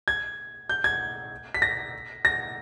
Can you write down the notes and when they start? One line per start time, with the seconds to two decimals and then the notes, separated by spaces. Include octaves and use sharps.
0.08 G#6
0.69 G6
0.84 G#6
1.54 B6
1.62 A#6
2.25 A#6